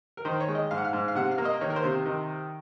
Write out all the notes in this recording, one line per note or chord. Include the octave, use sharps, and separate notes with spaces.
A#4
D#3 C5
C#5
G#3
D#5
G#2 F5
F#5
F5
G#2
F5
C3 F#5
F5
A#3
D#5
D#3 C#5
A#4
C5
C3
D#3